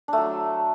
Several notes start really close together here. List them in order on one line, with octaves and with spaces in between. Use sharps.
D4 A3 F#3